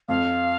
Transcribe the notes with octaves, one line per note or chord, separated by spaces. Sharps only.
F2 F5